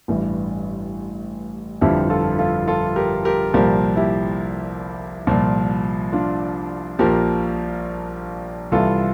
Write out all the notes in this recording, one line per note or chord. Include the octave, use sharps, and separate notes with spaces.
A1 G2 E3
G1 F2 D3 F3 E4 G4
F4 A4
F4 A4
F4 A4
G4 A#4
G4 A#4
C2 A#2 F3 G4 A#4
E4 G4
C2 A#2 F3
D4 F4
A#1 A#2 F3 G4 A#4
C2 C3 E3 F4 A4